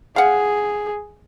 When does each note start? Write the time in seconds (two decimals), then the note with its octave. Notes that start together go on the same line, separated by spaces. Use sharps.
0.16 G#4 F5 F#5